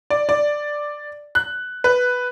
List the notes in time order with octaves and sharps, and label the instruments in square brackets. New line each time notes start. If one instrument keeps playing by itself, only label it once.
[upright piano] D5
D5
F#6
B4